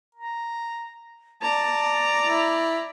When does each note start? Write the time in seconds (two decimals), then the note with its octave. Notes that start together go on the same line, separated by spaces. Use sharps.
0.14 A#5
1.42 D5 A5 A#5
2.24 E4